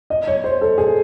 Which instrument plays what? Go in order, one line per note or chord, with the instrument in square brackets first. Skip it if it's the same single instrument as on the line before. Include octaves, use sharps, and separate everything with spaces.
[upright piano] D#5
C#5
C5
A4
G#4